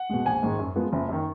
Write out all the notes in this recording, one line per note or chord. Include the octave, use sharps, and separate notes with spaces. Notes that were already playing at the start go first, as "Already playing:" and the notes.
Already playing: F#5
B2 G#3
A#1 G#5
G#2 D#3 G#3
F#2
F3 G#3 B3
F#1
F#2 D#3